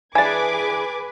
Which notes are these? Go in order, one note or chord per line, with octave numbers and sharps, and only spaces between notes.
E3 D4 G#4 B4 G#5 D6 G#6 A6